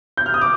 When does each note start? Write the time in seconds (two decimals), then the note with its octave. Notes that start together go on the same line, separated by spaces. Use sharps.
0.17 G6
0.26 F6
0.34 D#6
0.41 D6